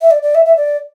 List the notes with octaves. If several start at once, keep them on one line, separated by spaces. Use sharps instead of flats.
E5
D5
D5
E5
E5
D5